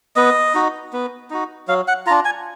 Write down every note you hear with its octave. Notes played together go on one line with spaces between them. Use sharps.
B3 D#5
D#4 F#4
B3
D#4 F#4
F#3 F5
F#5
D4 F4 A#5
G#5